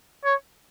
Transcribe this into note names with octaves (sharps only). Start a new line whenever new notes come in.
C#5